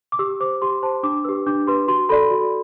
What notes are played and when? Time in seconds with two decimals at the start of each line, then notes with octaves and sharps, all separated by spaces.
0.12 D6
0.19 G4 E6
0.40 C5 D6
0.62 G4 C6
0.83 C5 A5
1.03 D4 D6
1.24 G4 B4 E6
1.47 D4 D6
1.67 G4 B4 C6
1.88 F#4 C6
2.09 A4 D5 B5
2.31 F#4